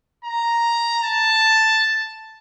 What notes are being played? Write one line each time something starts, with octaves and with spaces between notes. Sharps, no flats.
A#5
A5